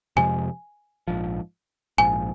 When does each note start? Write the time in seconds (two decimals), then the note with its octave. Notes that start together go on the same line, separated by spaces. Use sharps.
0.16 F2 C3 F3 G#3 G#5
1.08 A#1 G#2 F3
1.98 A#1 G#2 F3 G#5